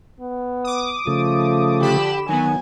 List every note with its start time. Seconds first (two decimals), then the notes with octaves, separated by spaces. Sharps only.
0.20 B3
0.64 D6 D#6
1.07 C#3 F3 A3
1.82 D3 G4 B5 E7
2.29 D#3 F#3 B3 G#5